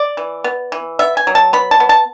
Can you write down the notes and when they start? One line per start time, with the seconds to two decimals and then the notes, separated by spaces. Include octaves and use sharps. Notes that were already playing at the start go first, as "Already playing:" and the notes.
Already playing: D5
0.17 E3
0.44 B3
0.72 E3
0.99 B3 E5
1.17 G#5
1.27 F#3
1.35 A5
1.53 B3 B5
1.71 A5
1.80 B3
1.89 A5